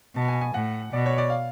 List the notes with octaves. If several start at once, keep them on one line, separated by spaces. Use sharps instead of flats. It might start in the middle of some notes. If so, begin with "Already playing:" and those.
B2 A5
G#5
G#5
A2 F#5
B2 D5
C#5
D5
F5